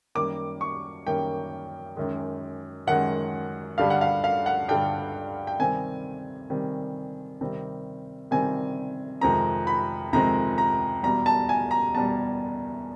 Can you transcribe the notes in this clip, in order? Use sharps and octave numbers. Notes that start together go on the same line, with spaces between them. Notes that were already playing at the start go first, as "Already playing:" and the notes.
F#2 D#3 G3 A#3 D6
C#6
F#2 D#3 G3 A#3 G5
F#2 D#3 G#3
F#2 D#3 G#3 F#5
G2 D3 G3 F5
F#5
F5
F5
F#5
G2 D3 G3 G5
G5
C3 D#3 G3 C4 G#5
C3 D#3 G3 C4
C3 D#3 G3 C4
C3 D#3 G3 C4 G#5
F2 C3 D#3 G#3 C4 A#5
B5
F2 C3 D#3 G#3 C4 A#5
A#5
E2 B2 G3 A#5
A5
G#5
A#5
E2 B2 G3 A5